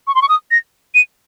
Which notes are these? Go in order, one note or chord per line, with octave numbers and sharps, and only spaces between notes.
C#6
C6
C#6
D#6
A#6
D#7